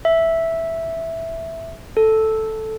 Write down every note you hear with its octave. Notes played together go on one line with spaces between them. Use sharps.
E5
A4